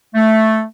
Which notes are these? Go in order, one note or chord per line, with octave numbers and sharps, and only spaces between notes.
A3